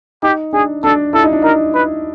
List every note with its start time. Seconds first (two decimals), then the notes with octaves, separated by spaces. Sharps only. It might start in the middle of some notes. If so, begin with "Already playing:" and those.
0.23 D#4 G4
0.53 D4 G#4
0.84 D4 A4
1.13 E4 A4
1.24 D#4
1.33 D4
1.42 D#4 A#4
1.74 B4